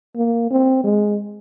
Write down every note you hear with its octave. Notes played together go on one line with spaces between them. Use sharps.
A#3
C4
G#3